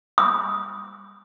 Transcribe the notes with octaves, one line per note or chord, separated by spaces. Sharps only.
D#6